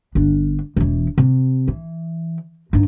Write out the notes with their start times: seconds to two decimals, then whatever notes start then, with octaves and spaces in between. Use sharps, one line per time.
0.15 G1 D4
0.76 E1 E3
1.18 C3
1.68 E3
2.73 G2 D#4